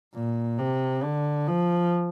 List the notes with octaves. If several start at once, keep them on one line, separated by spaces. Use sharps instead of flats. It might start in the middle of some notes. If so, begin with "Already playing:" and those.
A#2
C3
D3
F3